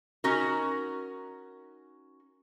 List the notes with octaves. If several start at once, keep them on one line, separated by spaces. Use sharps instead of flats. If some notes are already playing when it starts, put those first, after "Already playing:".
C#4 D#4 F#4 A#4